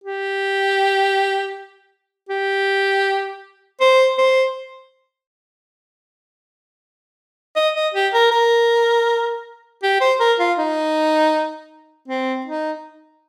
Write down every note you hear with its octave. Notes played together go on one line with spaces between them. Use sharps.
G4
G4
C5
C5
D#5
D#5
G4
A#4
A#4
G4
C5
A#4
F4
D#4
C4
D#4